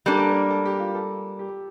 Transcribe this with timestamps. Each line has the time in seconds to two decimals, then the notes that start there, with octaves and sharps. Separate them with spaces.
0.06 G3 A#3 D4 A4
0.18 A4
0.29 A#4
0.50 A4
0.65 G4
0.80 F4
0.95 A4
1.39 G4